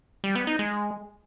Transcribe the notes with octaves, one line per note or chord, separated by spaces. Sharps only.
G3
B3
D#4
G#3